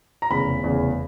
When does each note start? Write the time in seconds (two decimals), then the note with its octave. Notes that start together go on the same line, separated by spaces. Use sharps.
0.22 A#5
0.31 F1 E2 C#3 B5
0.63 F1 E2 C#3